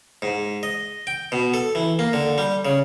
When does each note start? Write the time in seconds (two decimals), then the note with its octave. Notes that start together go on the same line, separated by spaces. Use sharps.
0.22 G#2
0.63 D#5
1.07 G5
1.32 B2
1.54 A4
1.75 E3
1.99 A#3
2.13 D3
2.38 G3
2.65 C#3